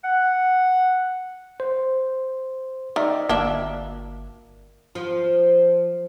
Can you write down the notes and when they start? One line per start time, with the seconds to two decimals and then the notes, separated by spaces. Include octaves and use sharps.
0.04 F#5
1.60 C5
2.96 D#3 D5 E5 A#5
3.29 G1 A#3 D4 E5
4.95 F3